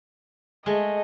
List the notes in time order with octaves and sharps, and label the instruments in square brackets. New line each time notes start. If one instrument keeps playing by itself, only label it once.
[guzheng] G#3 A3 [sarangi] D#5